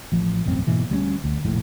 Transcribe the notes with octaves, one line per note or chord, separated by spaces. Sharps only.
A1 F3
E1 A1 F#2 C4
G#2 B2 E3 A#3
D2 G3 B3 C#4
D2
F1 A#1 A2